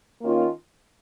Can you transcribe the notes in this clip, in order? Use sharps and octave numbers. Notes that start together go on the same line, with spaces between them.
D#3 A#3 C#4 F4